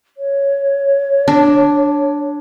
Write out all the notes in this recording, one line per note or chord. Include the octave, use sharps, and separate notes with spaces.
C#5
D4